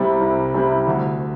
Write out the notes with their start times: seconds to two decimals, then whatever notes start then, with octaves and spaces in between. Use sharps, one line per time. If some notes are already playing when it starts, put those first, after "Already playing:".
Already playing: C2 C3 G3 C4 E4
0.21 C2
0.54 C3 G3 C4 E4
0.87 D2